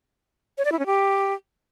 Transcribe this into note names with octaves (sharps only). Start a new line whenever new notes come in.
C#5
D5
E4
C#4
G4